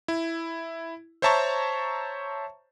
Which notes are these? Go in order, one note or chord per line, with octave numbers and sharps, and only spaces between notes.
E4
C5 C#5 E5 A5 A#5 C#6